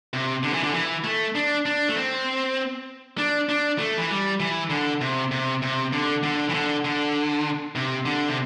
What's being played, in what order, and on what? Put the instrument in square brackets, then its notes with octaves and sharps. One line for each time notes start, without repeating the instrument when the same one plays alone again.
[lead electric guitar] C3
D3
E3
D3
E3
A3
D4
D4
A3
C4
D4
D4
A3
E3
G3
E3
D3
C3
C3
C3
D3
D3
E3
D3
D3
C3
D3
C3